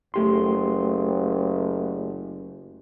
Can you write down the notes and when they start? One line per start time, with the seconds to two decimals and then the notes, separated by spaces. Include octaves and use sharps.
0.14 F#1 A3 G4 C6